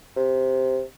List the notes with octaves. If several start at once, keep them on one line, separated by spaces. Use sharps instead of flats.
C3